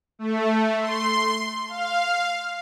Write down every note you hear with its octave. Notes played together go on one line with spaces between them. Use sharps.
A3
C6
F5